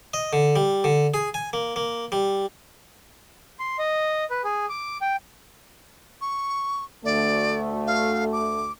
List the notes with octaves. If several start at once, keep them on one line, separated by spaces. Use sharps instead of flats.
D#5
D3
G3
D3
G#4
G#5
A#3
A#3
G3
C6
D#5
B4
G#4
D6
G5
C#6
D2 A3 D5
F5
D6